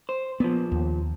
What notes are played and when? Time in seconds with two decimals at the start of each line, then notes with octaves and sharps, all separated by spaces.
0.09 C5
0.40 A#2 F3 B3
0.72 D#2